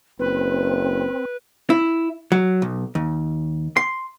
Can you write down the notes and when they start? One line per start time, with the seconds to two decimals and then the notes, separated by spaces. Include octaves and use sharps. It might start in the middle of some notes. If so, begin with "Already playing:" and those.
0.19 F#1 C4 B4
1.70 E4
2.32 F#3
2.62 B1
2.95 D#2
3.77 C6